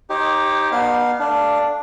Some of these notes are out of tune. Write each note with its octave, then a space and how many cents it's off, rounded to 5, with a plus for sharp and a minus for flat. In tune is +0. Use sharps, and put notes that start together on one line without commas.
D#4 +0 G4 +0 C#5 -45
B3 -30 D#4 -45 F5 +0
A3 +0 D4 +0 F5 -15